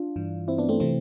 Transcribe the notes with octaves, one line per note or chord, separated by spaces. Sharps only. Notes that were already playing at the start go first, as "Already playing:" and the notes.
Already playing: D4 F4
G2 E3
C4 E4
B3 D4
A3 C4
C3 E3 A3 C4